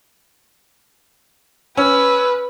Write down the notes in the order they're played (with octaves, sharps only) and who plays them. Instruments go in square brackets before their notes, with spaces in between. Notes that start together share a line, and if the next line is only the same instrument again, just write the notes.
[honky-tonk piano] C#4 [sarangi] B4 [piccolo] E6